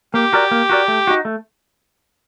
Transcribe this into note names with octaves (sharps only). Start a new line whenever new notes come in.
A#3 G4
F#4 A#4 D5
A#3
F#4 A#4 D5
A3
D#4 F#4
A3